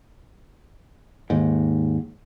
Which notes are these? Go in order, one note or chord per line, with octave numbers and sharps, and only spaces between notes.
D#2 G#2